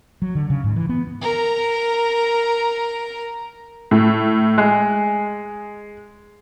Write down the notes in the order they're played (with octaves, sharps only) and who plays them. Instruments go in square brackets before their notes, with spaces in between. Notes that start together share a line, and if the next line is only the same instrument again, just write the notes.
[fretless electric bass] F#3
D3
C#3
G#2
E3
B3
[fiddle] A#4 A#5
[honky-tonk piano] A2
G#3